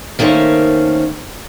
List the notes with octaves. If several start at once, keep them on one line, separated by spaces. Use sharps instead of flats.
D#3 A3 A#3 C#4 C5